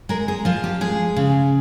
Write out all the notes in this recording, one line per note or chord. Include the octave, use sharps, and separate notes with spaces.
G#3 A#4
G#4
F3 F4
G4
G#3 G#4
C#3